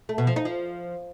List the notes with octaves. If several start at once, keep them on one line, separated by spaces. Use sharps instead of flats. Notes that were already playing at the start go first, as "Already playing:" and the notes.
A3
B2
F3
D#4
F3